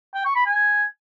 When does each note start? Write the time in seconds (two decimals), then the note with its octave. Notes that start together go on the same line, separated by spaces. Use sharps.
0.14 G5
0.25 C#6
0.35 B5
0.46 G#5